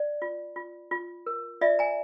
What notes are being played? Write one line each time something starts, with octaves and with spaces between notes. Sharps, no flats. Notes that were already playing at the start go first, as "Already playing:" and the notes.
Already playing: D5
F4
F4
F4
A#4
F4 D5 E5
G#5 A#5